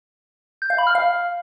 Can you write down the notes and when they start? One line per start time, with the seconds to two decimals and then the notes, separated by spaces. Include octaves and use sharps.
0.62 G6
0.70 F5
0.78 B5
0.87 F6
0.95 F5